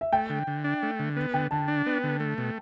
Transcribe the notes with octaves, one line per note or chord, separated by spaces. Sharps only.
E5
A3 G5
D3
D3
D4
A3
D3
B3
D3 G5
D3 A5
D4
B3
D3
A3
B2